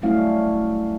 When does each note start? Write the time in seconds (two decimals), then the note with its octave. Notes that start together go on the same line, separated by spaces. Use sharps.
0.02 F#3 G3 A3 C#4 E4 F5